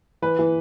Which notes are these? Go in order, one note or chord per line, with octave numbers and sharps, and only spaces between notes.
E3 B4
E3